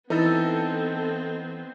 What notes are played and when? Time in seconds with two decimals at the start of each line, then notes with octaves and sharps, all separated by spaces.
0.10 E3 B3 C4 D#4 E4 A4 D#5